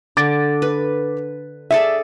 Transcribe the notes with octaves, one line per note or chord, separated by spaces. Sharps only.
D3 D6 A6 D7
B4
G#4 A4 D5 E5